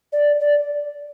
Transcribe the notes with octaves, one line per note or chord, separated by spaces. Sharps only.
D5
D5